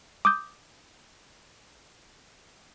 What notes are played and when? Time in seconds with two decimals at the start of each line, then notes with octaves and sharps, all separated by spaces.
0.25 D6 D#6 G6